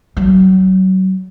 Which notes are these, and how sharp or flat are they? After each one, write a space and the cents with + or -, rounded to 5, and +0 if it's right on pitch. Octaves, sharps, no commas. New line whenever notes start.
F#3 +25